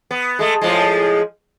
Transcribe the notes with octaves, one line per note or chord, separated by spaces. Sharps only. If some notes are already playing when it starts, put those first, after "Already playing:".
B3
G#3 A3
A2 F3 G#3